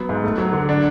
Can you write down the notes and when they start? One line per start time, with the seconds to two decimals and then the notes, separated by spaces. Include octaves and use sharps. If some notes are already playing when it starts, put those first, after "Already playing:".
Already playing: F#3 B3
0.09 G#2
0.24 A3
0.38 F#3
0.53 D3
0.69 D4